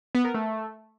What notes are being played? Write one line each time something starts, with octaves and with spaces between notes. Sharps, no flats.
B3
A#4
A3